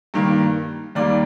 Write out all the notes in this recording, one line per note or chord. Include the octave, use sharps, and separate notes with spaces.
G2 D#3 A#3
D#2 D#3 G3 A#3 D5